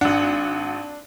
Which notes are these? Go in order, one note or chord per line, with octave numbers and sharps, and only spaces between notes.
G#1 D4 F#5